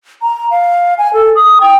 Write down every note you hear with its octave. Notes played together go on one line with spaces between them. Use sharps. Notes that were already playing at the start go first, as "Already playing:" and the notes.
A#5
F5
G#5
A4
D#6
G5